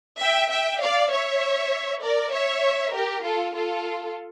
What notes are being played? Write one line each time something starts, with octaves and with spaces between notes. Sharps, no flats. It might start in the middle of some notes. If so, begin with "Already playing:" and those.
E5 G5
E5 G5
D5 F5
C#5 E5
A#4 D5
C#5 E5
G4 A#4
F4 A4
F4 A4